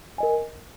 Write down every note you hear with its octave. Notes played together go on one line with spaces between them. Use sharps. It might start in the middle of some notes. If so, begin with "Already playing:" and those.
A#4 D#5 G#5